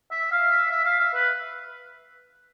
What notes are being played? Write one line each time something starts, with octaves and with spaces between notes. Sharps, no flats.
E5
F5
E5
E5
F5
E5
B4